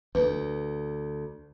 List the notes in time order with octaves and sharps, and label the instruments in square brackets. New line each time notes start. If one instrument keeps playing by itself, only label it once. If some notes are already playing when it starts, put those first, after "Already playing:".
[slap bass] D2 [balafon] B4